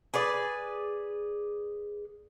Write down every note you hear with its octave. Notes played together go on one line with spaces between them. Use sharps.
G#4 B4 D5